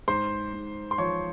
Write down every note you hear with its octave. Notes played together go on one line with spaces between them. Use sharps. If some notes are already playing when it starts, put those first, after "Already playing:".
G#2 C5 C6
G#2
C6
F3 C#5 C#6